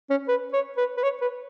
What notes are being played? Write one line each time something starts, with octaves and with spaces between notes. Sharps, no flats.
C#4
B4
C#5
B4
B4
C#5
B4